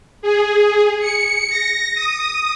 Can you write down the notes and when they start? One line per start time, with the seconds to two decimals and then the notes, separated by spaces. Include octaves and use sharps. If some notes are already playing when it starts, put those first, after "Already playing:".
0.22 G#4
1.00 C#7
1.49 A#6
1.94 D#6